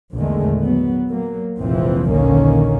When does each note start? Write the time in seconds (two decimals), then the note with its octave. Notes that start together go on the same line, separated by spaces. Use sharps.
0.15 A#1 E2 D3 D#3 G#3 A3
0.63 F#3 B3
1.09 F#3 A#3
1.60 F1 A#1 G#2 E3 F3 C4
2.11 A#1 D#2 D3 D#3 A#3 C#4